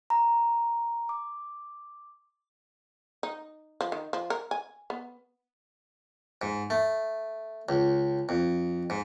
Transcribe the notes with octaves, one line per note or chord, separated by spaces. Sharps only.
A#5
D6
D#4
F3
D#3
F3
A#4
G#5
B3
G#2
A3
C#2
F2
G#2